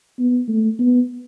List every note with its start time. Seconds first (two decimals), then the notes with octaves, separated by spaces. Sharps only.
0.19 B3
0.48 A3
0.79 B3